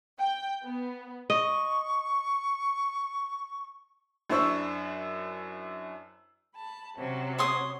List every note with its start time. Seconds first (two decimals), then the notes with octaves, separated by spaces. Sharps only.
0.19 G5
0.64 B3
1.30 D#5 C#6
4.30 F#2 D4 E4 C5 C#6 E6
6.56 A5 B5
6.97 C3 F#3 C#4
7.38 C#5 C6 D#6